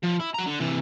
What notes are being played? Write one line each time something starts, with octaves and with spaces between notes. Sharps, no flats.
F3
E4
F#4 A#5
D3
C3 E3